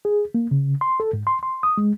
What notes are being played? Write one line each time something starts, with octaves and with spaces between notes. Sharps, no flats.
G#4
A#3
C#3
C6
A4
G#2
C6
C6
D#6
G#3